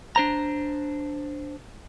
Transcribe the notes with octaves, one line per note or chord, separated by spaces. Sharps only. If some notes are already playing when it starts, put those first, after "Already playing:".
D4 C5 A#5